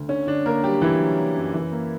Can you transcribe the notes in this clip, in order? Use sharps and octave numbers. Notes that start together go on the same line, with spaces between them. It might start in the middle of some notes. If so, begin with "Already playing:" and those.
Already playing: D2
D3 C#4
D3 D4
D3 A#3 A#4
F#3 G3 G4
E3 A#3 E4
F#3
A#3
F#2
E3
A#3